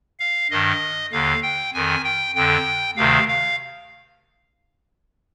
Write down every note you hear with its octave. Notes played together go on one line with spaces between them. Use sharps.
F5
G2 D#3 D#5
D#2 D3 F5
G5
F2 D#3 G#5
G5
F2 D3 G5
D2 C3 D#3 F5
F5